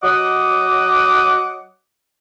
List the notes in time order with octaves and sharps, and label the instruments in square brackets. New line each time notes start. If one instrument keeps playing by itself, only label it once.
[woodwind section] F#3 D#5 F#5 D6